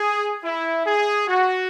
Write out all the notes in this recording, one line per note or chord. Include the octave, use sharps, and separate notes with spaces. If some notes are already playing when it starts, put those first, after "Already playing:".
Already playing: G#4
E4
G#4
F#4